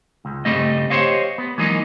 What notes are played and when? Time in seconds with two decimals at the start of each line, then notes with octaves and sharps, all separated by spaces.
0.25 C#2
0.45 G2 C#3 G3 A3 C4 D#5
0.90 G4 C5 C#5 D#5 F5
1.38 B3
1.58 E3 F#3 G#3 A#3 D#4